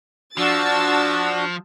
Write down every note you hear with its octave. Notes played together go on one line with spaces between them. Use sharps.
F3 D4 F#4 A5 E6 A6